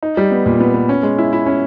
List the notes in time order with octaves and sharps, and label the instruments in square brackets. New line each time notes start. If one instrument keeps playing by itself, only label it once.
[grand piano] D#4
G3
B3
A#2
B3
B3
C#4
G#3
E4
E4
C#4